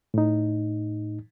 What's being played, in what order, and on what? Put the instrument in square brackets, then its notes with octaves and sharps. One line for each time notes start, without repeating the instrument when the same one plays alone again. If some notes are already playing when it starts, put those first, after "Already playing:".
[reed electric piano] A2 D#4